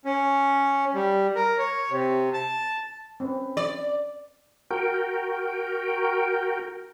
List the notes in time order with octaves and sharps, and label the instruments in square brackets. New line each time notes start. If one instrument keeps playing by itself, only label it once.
[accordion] C#4
G3
A#4
C#5
C3
A5
[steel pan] C4 C#4 B4
[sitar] D5
[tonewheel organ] F#4 A#4 G5